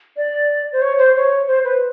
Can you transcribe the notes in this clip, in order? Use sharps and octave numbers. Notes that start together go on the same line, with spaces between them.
D5
C5
C#5
C5
C#5
C5
B4